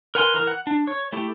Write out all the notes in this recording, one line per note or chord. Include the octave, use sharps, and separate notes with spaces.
A#4 B4 F#5 G#5 C6
E3 A#4
F#5
D4
C#5
A3 E4 G4